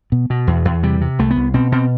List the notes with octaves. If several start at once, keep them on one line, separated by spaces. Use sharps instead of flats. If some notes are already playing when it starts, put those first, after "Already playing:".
B2
B2
E2
E2
C3 G3
C3
C2 A3
B3
C2
B2 C4
B2 C4